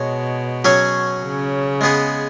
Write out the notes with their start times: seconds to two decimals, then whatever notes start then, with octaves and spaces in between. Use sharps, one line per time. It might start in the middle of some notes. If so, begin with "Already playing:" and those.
Already playing: B2 G#3 C#5
0.65 F#3 C#4 G#4 C#5
1.23 C#3
1.81 G#3 B3 G#4